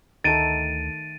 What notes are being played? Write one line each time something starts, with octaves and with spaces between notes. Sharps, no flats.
D2 D#3 A3 A6 D7 D#7